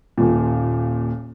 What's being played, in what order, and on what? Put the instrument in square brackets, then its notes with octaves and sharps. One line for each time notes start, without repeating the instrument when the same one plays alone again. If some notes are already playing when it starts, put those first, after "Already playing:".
[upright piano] D#1 A#2